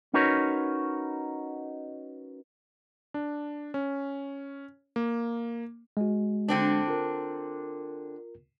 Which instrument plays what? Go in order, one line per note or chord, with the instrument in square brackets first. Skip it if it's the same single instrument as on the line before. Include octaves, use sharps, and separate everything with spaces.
[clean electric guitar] C#4 D#4 F#4 A#4 B4 C#5
[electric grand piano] D4
C#4
A#3
[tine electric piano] G#3 F#4
[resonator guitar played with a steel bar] D3 C4 D4
[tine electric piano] F4 A#4